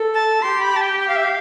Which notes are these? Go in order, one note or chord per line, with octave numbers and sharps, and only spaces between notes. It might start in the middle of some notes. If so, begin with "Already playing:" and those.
Already playing: A4
A5
G4 C6
B5
A5
G5
G5
F5
E5
F5